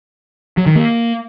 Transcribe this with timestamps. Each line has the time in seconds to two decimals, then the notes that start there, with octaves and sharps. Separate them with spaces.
0.57 F#3
0.66 D#3
0.76 A#3